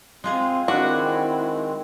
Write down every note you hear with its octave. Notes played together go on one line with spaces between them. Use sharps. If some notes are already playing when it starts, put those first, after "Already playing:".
G#3 C4 F4 G#4
D#3 G#3 C4 D4 E4 F#4